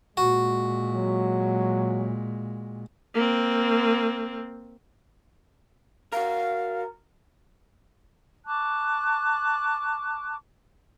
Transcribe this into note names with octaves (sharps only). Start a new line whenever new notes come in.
A#2 G#3 F#4
F#3
A#3 C4
F#4 A#4 F5
A5 C#6 D6 F#6